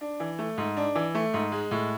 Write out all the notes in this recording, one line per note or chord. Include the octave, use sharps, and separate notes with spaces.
D4
E3
A3
G#2
D4
E3
A3
G#2
G#3
A2